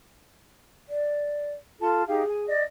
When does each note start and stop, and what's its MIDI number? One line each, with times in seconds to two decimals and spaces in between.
0.89 1.53 74
1.80 2.03 65
1.80 2.06 69
1.80 2.03 81
2.07 2.21 63
2.07 2.21 67
2.07 2.47 68
2.07 2.21 77
2.29 2.43 80
2.47 2.62 74
2.47 2.62 75